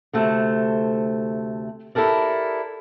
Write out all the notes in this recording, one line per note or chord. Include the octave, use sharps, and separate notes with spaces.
D2 C3 A3 C4
E4 G4 A4 A#4 D5